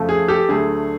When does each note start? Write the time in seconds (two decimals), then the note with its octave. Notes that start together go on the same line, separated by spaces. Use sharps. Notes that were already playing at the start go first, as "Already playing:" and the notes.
Already playing: F2 C#3 F3 A3
0.09 G#4
0.28 G4 A4
0.49 D2 D3 F#3 A3 G#4